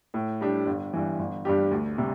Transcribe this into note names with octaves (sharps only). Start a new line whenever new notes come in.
A2
G3 D4 G4
G1
G2 E3
G1
G2 G3 D4 G4
D2
C3 G3